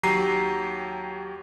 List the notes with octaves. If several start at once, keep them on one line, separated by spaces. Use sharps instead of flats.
D#2 F#3 G4 A#5 C7 D#7